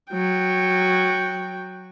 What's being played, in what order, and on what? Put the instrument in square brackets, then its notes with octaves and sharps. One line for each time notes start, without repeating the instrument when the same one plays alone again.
[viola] F#3 G5